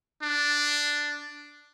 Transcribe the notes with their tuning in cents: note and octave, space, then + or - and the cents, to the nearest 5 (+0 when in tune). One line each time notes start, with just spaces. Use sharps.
D4 +0